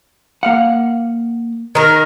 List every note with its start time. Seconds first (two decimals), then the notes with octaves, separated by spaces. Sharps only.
0.43 A#3 F5 F#5
1.75 D#3 A#4